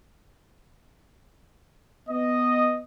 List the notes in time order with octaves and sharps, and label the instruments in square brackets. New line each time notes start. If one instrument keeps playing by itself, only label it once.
[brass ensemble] B3 D#5